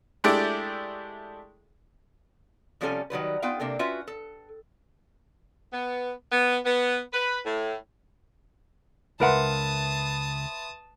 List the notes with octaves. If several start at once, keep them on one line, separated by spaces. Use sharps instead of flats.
G#3 A3 D4 E4 G4 D5
C3 F3 G3 C#4 A4 G#5
D#3 F#3 G3 B4
B3 D#4 F4 F5 G5
C3 A#3 D4 A4
C#4 F4 F#4 B4 E5
A4
B3
B3
B3
B4
A2
C#2 A#4 B4 E5 F#5 A5 C6 D#6